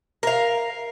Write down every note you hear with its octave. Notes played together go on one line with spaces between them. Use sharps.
A#4 F5